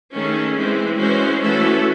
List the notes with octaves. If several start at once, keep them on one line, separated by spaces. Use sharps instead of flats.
D#3 A3 C#4 G#4
E3 G#3 C4
E3 G#3 C#4 F#4 C5
E3 A3 C#4 F#4 A4